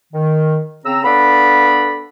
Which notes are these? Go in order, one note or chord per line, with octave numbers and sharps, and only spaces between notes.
D#3
C#3 C4 A#5 E6
B3 D4 A4 F5 B5